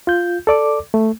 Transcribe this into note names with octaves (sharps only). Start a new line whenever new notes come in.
F4 G6
A4 D5 D6
A3